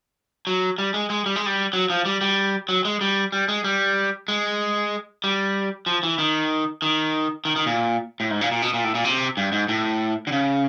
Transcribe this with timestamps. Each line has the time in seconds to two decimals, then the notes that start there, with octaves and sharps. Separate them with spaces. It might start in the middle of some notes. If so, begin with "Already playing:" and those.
0.47 F#3
0.78 G3
0.94 G#3
1.10 G#3
1.26 G3
1.36 G#3
1.46 G3
1.73 F#3
1.90 F3
2.05 G3
2.21 G3
2.69 F#3
2.85 G#3
3.01 G3
3.32 G3
3.48 G#3
3.64 G3
4.28 G#3
5.24 G3
5.86 F3
6.03 E3
6.19 D#3
6.82 D#3
7.45 D#3
7.56 D#3
7.66 A#2
8.20 A2
8.31 G#2
8.41 A#2
8.51 A#2
8.62 B2
8.73 A#2
8.84 A2
8.95 A#2
9.05 C3
9.37 G2
9.52 G#2
9.68 A2
10.27 D3
10.32 C#3